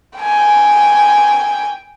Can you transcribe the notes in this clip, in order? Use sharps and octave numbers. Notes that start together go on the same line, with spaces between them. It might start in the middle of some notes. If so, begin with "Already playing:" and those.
G5 G#5